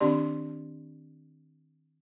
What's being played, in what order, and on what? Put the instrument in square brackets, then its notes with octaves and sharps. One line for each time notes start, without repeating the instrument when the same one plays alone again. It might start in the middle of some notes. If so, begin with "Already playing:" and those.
[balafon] D#3 C4 D4 G4 D5 C6